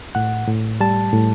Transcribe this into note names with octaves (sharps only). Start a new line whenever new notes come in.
A2 F#5
A2
G3 A5
A2